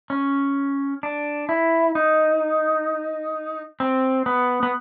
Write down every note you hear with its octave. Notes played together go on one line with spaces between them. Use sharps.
C#4
D4
E4
D#4
C4
B3
B3